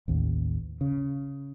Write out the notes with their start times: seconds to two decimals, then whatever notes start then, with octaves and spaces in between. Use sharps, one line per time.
0.08 A1 D#2
0.81 C#3